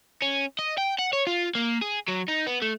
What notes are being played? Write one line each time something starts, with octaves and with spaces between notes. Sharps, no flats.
C#4
D#5
G5
F#5
C#5
F4
A#3
G#4
F#3
D#4
B3
A3